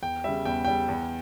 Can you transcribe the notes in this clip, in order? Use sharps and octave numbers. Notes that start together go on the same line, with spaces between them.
E2 G5
C#3 G3 E5
E2 G5
C#3 G3 G5
E2